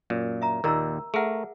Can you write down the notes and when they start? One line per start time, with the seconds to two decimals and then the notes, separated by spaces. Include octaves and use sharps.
0.10 F#2 A#2
0.42 E5 A#5
0.64 D#2 A#2 D#3 A#4 A#5 E6
1.14 A3 G#4 A#4 E5 F#5